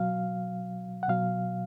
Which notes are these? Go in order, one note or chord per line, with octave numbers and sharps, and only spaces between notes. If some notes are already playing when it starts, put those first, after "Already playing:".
Already playing: B2 F#3 F5
F#5
B2 F#3 F5